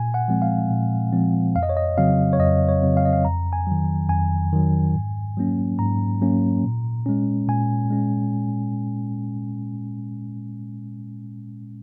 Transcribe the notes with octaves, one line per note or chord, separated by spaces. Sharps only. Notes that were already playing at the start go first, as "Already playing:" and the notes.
Already playing: A#2 G#5
F#5
F3 G#3 C4
F5
A#2
F3 G#3 C4
F2 F5
D#5
C#5
D#5
C#3 F#3 C4 F5
C#5
F2 D#5
C#5
C#3 F#3 C4
F5
D#5
F5
F2 A#5
G#5
D#3 F#3
F2 G#5
D#3 F#3
G#2
F#3 A#3 C#4
G#2 A#5
F#3 A#3 C#4
A#2
G#3 C#4
A#2 G#5
G#3 C#4